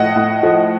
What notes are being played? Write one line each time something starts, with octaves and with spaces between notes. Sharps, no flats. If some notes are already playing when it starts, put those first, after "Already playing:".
Already playing: A2 F3 D#5 F#5
A2
F3